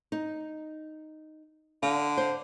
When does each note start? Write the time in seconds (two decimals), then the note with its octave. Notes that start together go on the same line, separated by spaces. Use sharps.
0.12 D#4
1.83 D3 F5
2.17 C5